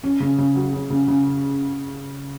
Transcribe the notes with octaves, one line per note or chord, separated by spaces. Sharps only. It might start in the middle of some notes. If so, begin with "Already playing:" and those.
C#4
C#3
C#3
F#3
C#4
C#3
C#3